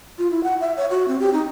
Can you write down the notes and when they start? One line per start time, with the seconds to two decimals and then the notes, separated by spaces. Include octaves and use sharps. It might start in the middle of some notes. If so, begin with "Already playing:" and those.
0.18 F4
0.31 E4
0.44 F#5
0.60 E5
0.77 C#5
0.90 F#4
1.08 C4
1.20 G4
1.33 D#4